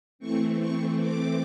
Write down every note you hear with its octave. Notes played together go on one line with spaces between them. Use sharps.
E3 A3 C4 C#6
C#6
D6